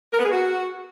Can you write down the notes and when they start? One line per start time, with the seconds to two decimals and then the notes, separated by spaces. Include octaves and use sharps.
0.13 A#4
0.19 B3
0.25 G#4
0.31 F#4